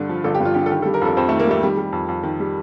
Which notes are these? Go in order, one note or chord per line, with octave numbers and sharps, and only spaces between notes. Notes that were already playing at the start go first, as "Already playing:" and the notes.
Already playing: G2 D3 A4
F3
G1 A4
G4
G2
F4
D3 G4
A4
D#3 G4
G3 A4
A#4
F2 A4
F2 C4
D#3 A3
A#3
G3 A3
D#3 G3
G3
F2
F2
D#3
G3